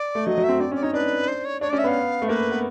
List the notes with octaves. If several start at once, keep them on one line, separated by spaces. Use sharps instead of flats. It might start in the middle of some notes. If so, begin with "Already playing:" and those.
Already playing: D5
A3
F#3 D#5
F#3
E5
C4
C4 D5
C#4
D5
D#4 C#5
D4 B4
C5
C#5
D4 C#5
C#4 D5
E5
B3 F5
A3
A#3 B4
B3